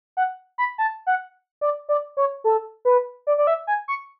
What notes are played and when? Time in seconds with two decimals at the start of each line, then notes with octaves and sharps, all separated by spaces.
0.17 F#5
0.58 B5
0.78 A5
1.07 F#5
1.61 D5
1.89 D5
2.17 C#5
2.44 A4
2.85 B4
3.27 D5
3.38 D5
3.47 E5
3.67 G#5
3.88 C#6